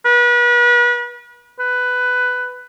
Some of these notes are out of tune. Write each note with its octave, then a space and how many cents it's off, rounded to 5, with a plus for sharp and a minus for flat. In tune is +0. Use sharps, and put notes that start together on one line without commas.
B4 -35
B4 +10